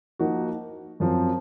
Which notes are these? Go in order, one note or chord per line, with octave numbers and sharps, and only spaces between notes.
F3 A#3 D#4 F#4
F#2 F3 C4